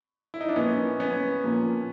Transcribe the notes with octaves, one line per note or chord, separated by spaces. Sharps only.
E4
D#4
D4
A#2 F3 A#3 B3 C#4
B3 C#4
A#2 F3 A#3